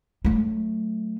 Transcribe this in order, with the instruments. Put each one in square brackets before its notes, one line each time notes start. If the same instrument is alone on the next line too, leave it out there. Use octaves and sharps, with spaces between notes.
[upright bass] F#3 A3